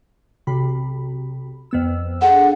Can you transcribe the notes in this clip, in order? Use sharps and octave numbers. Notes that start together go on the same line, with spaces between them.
B1 C3 B5
F2 B3 E6
D4 G#4 A4 F#5